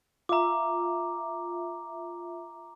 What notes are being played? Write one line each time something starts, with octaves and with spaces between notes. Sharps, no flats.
F4 E5 A#5 D6